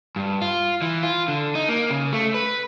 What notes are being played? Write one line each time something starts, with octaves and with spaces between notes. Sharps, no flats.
G2
F4
E3
F4
D3
D#4
A#3
C#3
A3
B4